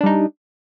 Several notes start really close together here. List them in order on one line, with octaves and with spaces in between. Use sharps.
D4 G3 D#4